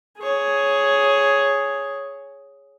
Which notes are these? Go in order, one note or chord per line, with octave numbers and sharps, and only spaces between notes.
G#4 C#5